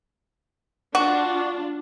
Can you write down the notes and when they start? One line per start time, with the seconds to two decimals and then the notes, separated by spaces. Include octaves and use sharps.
0.95 D4 F4 F#4